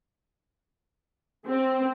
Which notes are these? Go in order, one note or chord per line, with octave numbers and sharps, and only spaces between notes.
C4